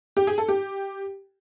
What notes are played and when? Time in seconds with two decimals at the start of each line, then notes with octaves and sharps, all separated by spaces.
0.17 G4
0.27 G#4
0.38 A4
0.49 G4